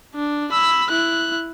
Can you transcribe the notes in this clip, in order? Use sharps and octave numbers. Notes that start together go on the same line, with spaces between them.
D4
B5 E6
E4 F#6